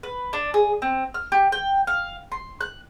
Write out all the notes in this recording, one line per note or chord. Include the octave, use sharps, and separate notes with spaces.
B4
D4
G#4
C4
F6
G4
G5
F5
C6
F#6